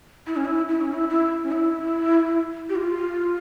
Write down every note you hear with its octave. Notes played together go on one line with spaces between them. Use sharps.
E4
C#4
E4
E4
C#4
E4
E4
C#4
E4
G4
F4